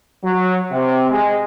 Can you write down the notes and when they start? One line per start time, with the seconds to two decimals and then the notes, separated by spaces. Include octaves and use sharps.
0.24 F#3
0.72 C3
1.11 G#3